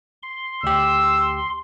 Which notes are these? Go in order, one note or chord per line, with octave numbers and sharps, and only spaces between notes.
C6
D2 G4 E6